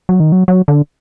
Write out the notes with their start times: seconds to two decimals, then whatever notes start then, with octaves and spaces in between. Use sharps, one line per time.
0.09 F#3
0.20 D#3
0.32 F#3
0.48 F#3
0.68 D3